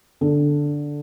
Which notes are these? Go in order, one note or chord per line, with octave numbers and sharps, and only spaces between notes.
D3